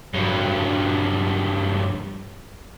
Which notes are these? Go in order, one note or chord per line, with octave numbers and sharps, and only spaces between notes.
G2 F#3